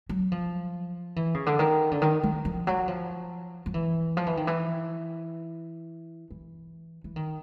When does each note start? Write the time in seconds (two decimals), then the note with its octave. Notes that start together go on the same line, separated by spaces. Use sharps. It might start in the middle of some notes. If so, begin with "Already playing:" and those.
0.09 F#3
0.32 F3
1.16 E3
1.34 C#3
1.46 D3
1.59 D#3
1.91 D3
2.02 D#3
2.23 D#3
2.45 F3
2.67 F#3
2.88 F3
3.66 F3
3.74 E3
4.17 F3
4.26 E3
4.37 D#3
4.47 E3
6.31 E3
7.04 E3
7.16 D#3